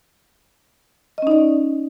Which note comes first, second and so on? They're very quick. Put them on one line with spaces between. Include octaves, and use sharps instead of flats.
D#5 C#4 D#4 D5